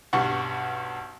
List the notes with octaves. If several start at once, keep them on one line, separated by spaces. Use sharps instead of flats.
B1 G2 F#5 C#6